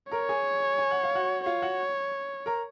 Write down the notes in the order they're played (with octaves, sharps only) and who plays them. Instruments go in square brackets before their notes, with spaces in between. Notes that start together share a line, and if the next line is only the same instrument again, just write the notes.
[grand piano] A#4 A#5 [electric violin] C#5
[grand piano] G#4 G#5
G#5
F#5
F5
F#4 F#5
[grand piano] F4 F5 [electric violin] C#5
[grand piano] F#4 F#5
A#4 A#5